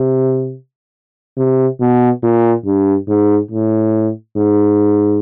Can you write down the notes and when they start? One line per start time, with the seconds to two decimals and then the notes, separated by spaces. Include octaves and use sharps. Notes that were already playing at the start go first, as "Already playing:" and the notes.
Already playing: C3
1.37 C3
1.81 B2
2.23 A#2
2.66 G2
3.08 G#2
3.51 A2
4.37 G#2